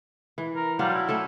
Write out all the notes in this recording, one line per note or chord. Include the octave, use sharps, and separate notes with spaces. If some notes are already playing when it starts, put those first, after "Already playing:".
E3
A#4
F#3 G3 D4 F4
E4
A3 C#4 A4